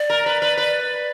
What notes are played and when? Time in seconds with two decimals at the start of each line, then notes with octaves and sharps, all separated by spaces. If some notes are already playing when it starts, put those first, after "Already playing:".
Already playing: D5
0.10 A#4
0.26 B4
0.42 B4
0.57 B4